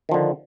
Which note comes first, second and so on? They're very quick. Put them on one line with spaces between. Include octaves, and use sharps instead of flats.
D#3 F3 D3